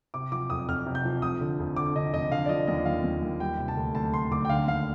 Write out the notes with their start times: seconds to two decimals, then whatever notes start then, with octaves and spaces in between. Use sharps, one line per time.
0.14 C3 D6
0.32 F3 D6
0.50 F2 D#6
0.68 F2 F6
0.86 C3
0.95 G6
1.05 F3
1.22 F1 D#6
1.41 D3
1.60 F1
1.76 D3 D6
1.96 D3 D#5
2.13 F1 D#5
2.32 D3 F5
2.46 D5
2.49 F3 D#5
2.67 D#2 D#5
2.85 D#2 F5
3.04 D#2
3.22 D#2
3.40 G3 G5
3.58 C3
3.68 A5
3.77 D2
3.95 D2 A5
4.14 D2 C6
4.31 D2 D6
4.45 G5
4.49 D3 F5
4.67 D#2 F5